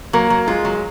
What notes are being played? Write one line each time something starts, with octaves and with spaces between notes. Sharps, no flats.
F#3 A#3
F#3
G#3 F4
F#3